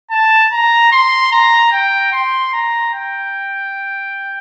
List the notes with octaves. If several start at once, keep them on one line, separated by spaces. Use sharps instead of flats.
A5
A#5
C6
A#5
G5
C6
A#5
G5